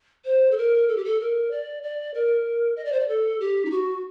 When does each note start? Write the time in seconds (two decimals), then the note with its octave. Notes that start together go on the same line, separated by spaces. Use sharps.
0.25 C5
0.51 A4
0.57 A#4
0.88 A4
0.97 G4
1.05 A4
1.20 A#4
1.51 D5
1.83 D5
2.14 A#4
2.76 D#5
2.85 D5
2.92 C5
3.00 D5
3.08 A4
3.40 G4
3.65 D#4
3.71 F#4